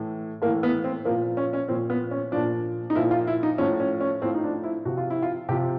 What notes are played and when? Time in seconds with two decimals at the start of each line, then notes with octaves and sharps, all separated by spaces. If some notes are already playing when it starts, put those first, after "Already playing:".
Already playing: A2 E3
0.42 A2 A#3
0.46 E3
0.63 B3
0.84 C4
1.05 F3 A#3
1.10 A#2
1.37 C#4
1.53 C#4
1.68 A#2 F3 C4
1.90 B3
2.11 C#4
2.32 A#2 F3 D4
2.90 D#4
2.95 A#2 F3 E4
3.11 F4
3.27 E4
3.43 D#4
3.58 A2 F3 C#4
3.80 C#4
4.00 C#4
4.22 A2 C4
4.24 F3
4.34 D#4
4.43 D4
4.64 E4
4.85 C3 F3 F#4
4.97 F4
5.10 E4
5.22 F4
5.49 C3 F3 G4